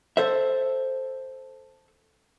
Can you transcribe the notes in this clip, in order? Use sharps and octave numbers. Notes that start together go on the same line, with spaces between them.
A4 C5 E5